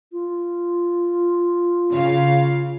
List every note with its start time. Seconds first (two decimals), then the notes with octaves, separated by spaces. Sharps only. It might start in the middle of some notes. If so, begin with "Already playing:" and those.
0.12 F4
1.91 C#3 F5